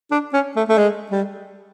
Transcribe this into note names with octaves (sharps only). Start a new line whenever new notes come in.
D4
C#4
A3
A3
G#3
G3